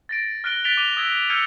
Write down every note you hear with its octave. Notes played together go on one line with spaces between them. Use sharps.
A6 A#6 D7
F6 F#6 A#6 D7 G7
F#6 A6 B6 D7 F7 G7
D6 D#7 F7 G7
D#6 E6 G#6 A#6 G7
E6 F6 G6 G#6 C#7 D#7